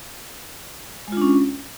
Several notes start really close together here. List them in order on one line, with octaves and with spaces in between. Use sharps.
G#3 F4 D4 C#4